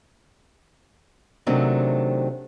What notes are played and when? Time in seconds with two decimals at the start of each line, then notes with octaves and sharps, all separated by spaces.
1.46 C3 D#3 F#3 A3 C4 D4